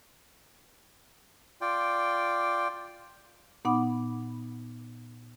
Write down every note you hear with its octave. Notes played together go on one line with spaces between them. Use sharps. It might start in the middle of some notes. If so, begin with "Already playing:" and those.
F4 D5 G5
A#2 B3 D#4 F#5 B5 D6